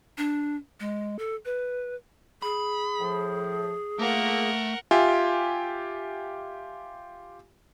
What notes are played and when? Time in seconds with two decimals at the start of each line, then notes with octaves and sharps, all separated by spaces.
0.18 D4
0.80 G#3
1.19 A4
1.45 B4
2.42 G#4 B5
2.99 A2 F3
3.99 A#2 A3 A#3 A#4 F#5
4.91 F4 G4 E5 G#5